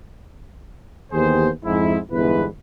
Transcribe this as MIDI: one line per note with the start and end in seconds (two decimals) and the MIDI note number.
1.12 1.49 39
1.12 1.49 52
1.12 1.49 59
1.12 1.49 67
1.12 1.49 68
1.12 1.49 72
1.65 1.97 41
1.65 1.97 44
1.65 1.97 64
2.12 2.45 31
2.12 2.45 40
2.12 2.45 44
2.12 2.45 64
2.12 2.45 71